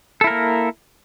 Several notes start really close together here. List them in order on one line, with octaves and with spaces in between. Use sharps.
A4 E4 A#4 A#3